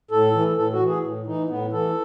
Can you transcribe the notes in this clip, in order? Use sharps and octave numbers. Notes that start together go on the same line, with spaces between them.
A2 A4
E3
A2 A4
F#4
E3
G#4
A2
E3 D#4
A2 B3
E3 A4